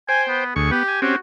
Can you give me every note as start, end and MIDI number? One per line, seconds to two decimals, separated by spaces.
0.09 0.44 72
0.09 0.44 79
0.09 0.23 80
0.29 0.56 59
0.56 0.71 38
0.56 0.67 68
0.56 0.71 85
0.71 0.83 59
0.71 0.97 67
0.88 1.01 80
1.02 1.16 60
1.02 1.16 61
1.02 1.16 66
1.02 1.16 67